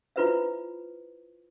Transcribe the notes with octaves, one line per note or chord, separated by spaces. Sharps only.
E4 F4 B4 C5 E5